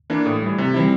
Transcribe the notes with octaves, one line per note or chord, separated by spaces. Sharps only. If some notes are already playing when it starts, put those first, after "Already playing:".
E3 A#3 D4
A2 A3
E3 G3
C3
E3 G3 C4 E4